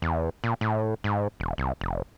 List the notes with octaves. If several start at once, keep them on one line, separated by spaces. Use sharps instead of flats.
E2
A#2
A2
G#2
E1
C2
F1